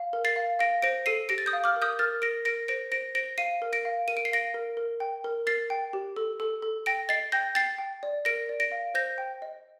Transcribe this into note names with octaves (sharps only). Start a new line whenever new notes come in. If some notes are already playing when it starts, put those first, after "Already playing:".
Already playing: F5
A#4
A6 C7
F5
F5 A#6 D7
C5 A#6 D7
A4 C7 D#7
G4 A#6 D7
A6
D#6 G6
F5
D6 F6
A#4
D#6 G6
A#4 F6 A6
A#4 A#6 D7
A#4 A#6 D7
C5 A#6 D7
C5 A#6 D7
C5 A#6 D7
F5 C7 D#7
A#4
A#6 D7
F5
A#4 D#7
D7
C7
F5 A#6 D7
A#4
A#4
G5
A#4
A#4 A6 C7
G5
G4
A4
A4
A4
G5 A#6 D7
D#5 A6 C7
G5 G6 A#6
G5 A6 C7
G5
D5
A#4 A#6 D7
D5
A#6 D7
F5
C5 G6 A#6
G5
D#5